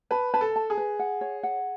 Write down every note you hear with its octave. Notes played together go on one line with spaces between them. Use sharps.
B4 A5
B4 A5
A4
A5
G#4
B4
F#5
C#5
F#5